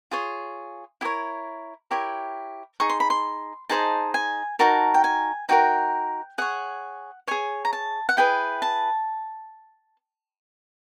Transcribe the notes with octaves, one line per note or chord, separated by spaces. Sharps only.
F4 G#4 C#5
E4 G4 A#4 C#5
E4 G4 A#4 C#5
D#4 G#4 C#6
C6
B5
C6
D#4 G#4 C5 D#5 A5
G#5
D#4 F#4 A#4 A5
G5
G#5
D#4 F#4 A#4 G5
G#4 C#5 F#5
G#4 C#5 G#5
A#5
A5
F#5
E4 G#4 B4 G5
A5